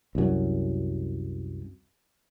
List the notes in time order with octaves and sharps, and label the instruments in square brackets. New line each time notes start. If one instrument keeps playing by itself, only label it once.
[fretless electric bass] C2 F#2